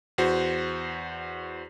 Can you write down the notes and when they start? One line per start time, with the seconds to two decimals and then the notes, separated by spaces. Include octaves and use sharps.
0.18 E2 F#4 C5